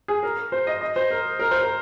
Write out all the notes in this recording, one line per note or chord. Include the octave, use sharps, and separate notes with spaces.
G#4
A#4
C5
D#5
D#5
C5
A#4
A#4
C5
A#4